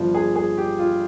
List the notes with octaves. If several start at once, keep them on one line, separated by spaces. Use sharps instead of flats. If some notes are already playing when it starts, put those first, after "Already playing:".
Already playing: G1 G2 F3
G#4
G#4
G4
F4